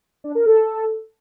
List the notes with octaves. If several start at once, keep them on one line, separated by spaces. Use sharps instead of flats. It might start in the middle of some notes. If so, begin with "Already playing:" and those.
D4
A#4
A4